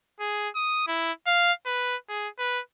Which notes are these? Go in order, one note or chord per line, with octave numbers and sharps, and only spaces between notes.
G#4
D#6
E4
F5
B4
G#4
B4